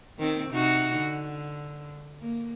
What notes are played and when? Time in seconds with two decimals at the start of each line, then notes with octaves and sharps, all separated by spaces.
0.19 D#3 C4
0.50 C3 D#4 F#4
0.97 D3
2.21 A#3